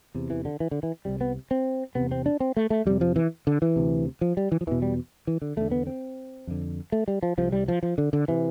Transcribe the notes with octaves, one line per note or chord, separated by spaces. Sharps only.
E2 C3
E3
D3
E3
D3
E3
C2 C3 G3
B3
C4
E2 C3 B3
C4
D4
C4
A3
A3
F2 C3 G3
F3
E3
D3
E3
D2 C3
F3
G3
E3
F3
E2 B2 E3
G3
E3
D3
E2 D3 A3
B3
C4
F2 D3
A3
G3
F3
C2 C3 F3
G3
F3
F3
D3
D3
C3 E3